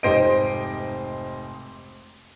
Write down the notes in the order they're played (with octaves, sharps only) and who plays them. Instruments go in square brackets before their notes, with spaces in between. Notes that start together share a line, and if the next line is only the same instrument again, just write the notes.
[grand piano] F1 G#2 D7 [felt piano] G4 C5 D#5